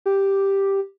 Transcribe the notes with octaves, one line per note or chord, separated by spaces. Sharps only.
G4